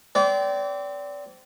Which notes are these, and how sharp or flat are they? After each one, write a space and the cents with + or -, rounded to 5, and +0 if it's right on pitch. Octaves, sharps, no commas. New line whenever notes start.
C4 -25 D5 -30